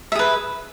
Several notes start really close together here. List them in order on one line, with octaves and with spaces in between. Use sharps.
E5 G#4 B4